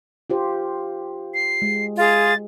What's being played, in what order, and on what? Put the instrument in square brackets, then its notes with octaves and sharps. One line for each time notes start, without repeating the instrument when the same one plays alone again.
[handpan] F4 G4 C5
[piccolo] C7
[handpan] G#3
[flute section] F4 G#4 [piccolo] A6